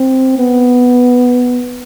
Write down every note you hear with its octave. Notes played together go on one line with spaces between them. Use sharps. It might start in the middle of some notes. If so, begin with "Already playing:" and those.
Already playing: C4
B3